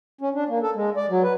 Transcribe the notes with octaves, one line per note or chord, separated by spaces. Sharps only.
C#4
D4
A#3
A4
G#3
D5
F#3
B4